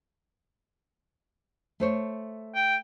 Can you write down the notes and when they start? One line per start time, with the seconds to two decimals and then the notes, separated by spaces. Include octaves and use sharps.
1.80 A3 C5 C#5
2.55 G5